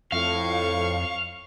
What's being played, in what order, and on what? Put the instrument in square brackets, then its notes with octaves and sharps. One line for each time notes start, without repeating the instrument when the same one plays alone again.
[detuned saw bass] F2 [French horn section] A2 [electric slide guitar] F5 [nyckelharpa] C#6